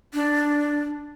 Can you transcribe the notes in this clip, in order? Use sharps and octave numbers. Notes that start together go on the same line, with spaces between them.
D4